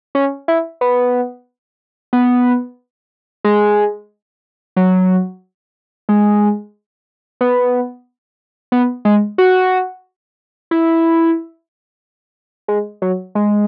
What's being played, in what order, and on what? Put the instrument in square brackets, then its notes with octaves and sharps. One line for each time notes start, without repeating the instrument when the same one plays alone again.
[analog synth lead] C#4
E4
B3
B3
G#3
F#3
G#3
B3
B3
G#3
F#4
E4
G#3
F#3
G#3